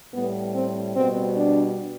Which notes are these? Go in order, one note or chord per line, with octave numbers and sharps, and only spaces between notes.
A2 G3 B3
C4
B2 G3 C4
D4